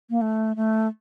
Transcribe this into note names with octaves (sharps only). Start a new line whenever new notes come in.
A#3
A3
A3